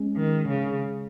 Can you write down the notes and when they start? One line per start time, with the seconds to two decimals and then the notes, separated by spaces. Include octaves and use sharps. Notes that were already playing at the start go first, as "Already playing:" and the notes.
Already playing: G#3 C#4
0.17 D#3
0.48 C#3